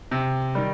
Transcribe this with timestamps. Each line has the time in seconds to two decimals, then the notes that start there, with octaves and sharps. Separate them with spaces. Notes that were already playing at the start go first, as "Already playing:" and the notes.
0.11 C3
0.55 D#3 G3